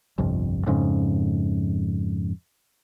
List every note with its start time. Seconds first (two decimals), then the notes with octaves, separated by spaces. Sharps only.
0.18 G1 C2 F2
0.66 F2 G#2 C#3